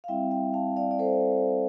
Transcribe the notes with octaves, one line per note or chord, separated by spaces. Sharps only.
F5
G3 C4 E4 E5 G5
E5 G5
F5 A5
D5 F5
D5
A4 C5